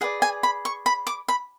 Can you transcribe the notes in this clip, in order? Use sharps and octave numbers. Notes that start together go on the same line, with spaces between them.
G#4 B4 D5 F#5
G#5
B5
C#6
B5
D6
B5